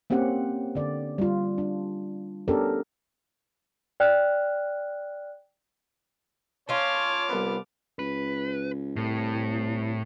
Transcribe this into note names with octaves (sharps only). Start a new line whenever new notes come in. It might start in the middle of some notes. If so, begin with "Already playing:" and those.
A#3 C4 C#4 G4 F#5
D3 D5
G3 F4
D4
B3 C#4 D4 G4 A4 A#4
D5 G5 F6 F#6
C#4 F4 C#5 A5 D6 F6
C2 B3
C#2 B4
C2 A2